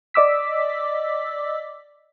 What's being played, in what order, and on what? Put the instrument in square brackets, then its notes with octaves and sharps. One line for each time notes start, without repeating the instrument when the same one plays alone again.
[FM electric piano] D5 D#5 D6 E6 B6